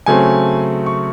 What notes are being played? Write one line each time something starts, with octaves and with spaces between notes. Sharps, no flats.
C#3 F#3 A3 C4 G#5
C#6